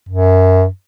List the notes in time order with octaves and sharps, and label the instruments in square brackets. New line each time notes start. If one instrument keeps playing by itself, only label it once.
[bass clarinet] F#2